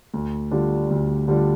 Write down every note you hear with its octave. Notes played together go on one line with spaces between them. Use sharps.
D2
D3 G3 D4 F4
D2
D3 G3 D4 F4